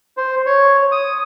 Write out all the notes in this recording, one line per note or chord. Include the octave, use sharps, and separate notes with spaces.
C5
C#5
D#6